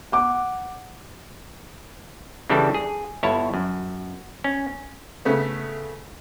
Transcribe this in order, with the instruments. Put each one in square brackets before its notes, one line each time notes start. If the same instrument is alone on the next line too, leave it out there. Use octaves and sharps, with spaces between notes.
[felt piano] F#5 D6
[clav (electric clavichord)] C#3 E3 G3 D4 A4
G#4
G1 E4 C#5 A5
F#2
C#4
[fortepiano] C#3 A3 B3